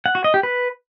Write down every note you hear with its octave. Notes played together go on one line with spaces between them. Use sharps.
F#5
F#4
D#5
G4
B4